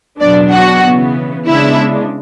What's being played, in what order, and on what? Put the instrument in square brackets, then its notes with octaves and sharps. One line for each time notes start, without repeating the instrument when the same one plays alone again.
[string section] E2 B2 F#3 B3 D4 D5
F#4 F#5
C#3 E3 B3
C#3 G#3 B3 D4 E4 E5